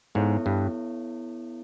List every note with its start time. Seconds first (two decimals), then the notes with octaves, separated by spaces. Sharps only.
0.15 G#2 B3 E4 A4 C#5
0.46 G2